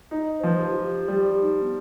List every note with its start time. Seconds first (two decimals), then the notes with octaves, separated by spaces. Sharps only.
0.11 D#4
0.40 C5
0.43 F3 B4
0.59 G4
0.72 F4
0.75 G4
1.08 G3
1.41 D#4
1.62 B3